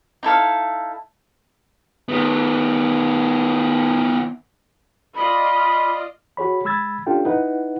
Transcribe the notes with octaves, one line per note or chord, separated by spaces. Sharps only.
D#4 E4 A4 F5
D#3 B3
F4 D5 D#5 B5
F#4 G#4 C#5 B5
G#3 B5 E6 G#6 A6
C#4 D4 F4 G4 A4 G5
D#4 E4 B4 F#5